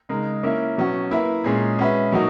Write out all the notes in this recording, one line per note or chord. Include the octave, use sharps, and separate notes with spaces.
C#3 G#3 D#4 A#4
A#3 C#4 E4 A#4 E5
B2 F#3 C#4 F#4
A#3 E4 B4 E5
A#2 G#3 C#4 G#4
G#3 C#4 F#4 B4 E5
B2 F#3 A#3 D#4 F#4